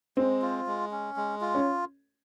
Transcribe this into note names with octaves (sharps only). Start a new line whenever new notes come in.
G#3 C4
F4
G#3
C#4
G#3
F4
C#4